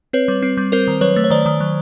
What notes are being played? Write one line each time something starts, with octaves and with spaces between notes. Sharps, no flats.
C4 B4 C#5
G3
C4
G3
C4 A#4 C5
D#3
F#3 B4 C#5
A3
C#5
D#3 C5 D5
D#3
F#3